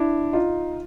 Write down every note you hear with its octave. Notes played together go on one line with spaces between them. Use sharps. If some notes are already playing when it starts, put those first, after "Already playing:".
Already playing: D4 E4
D#4 F4